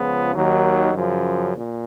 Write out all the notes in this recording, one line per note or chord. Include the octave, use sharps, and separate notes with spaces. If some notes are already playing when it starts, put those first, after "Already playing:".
Already playing: C#2 C#3 F3 B3
D#2 D#3 F#3
F#2 C#3 F3
A#2